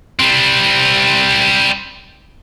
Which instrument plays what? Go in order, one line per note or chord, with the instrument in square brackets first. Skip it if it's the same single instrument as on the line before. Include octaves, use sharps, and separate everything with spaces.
[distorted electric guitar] G3 C4